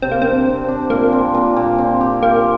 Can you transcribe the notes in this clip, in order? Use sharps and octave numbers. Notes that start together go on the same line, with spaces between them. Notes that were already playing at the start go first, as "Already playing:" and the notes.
C3 C4
A#3
C4 D4
C3
D4
A#2 A#3
C4
A#2
A#2
C4
G4
A#3 G4